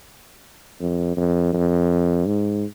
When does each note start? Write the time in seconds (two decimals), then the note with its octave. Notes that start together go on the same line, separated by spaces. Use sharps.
0.81 F2
1.17 F2
1.53 F2
2.26 G#2